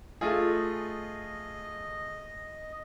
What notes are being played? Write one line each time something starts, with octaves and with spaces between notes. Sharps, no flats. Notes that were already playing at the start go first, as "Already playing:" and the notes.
A3 F4 G#4 D#5